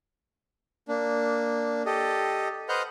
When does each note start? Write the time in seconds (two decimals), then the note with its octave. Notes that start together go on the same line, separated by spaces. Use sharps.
0.88 A#3 D4
1.86 G4 A4 D#5
2.69 B4 C5 D#5 F#5 F6 G6